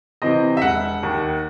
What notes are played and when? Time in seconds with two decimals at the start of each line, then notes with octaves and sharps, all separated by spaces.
0.22 C3 E3 C4 D#5
0.57 E5
0.62 E1 F#5
1.03 D#2 D#3